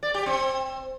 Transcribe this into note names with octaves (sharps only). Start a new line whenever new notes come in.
D5
G4
C4